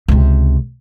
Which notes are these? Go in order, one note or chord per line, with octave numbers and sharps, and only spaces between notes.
C#2 C3